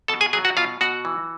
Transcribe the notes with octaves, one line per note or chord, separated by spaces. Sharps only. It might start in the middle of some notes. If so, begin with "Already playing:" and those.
B2 A4 A5
G#4 G#5
F#3 G#4 G#5
F#4 F#5
B2 F4 F5
B2 F#4 F#5
E3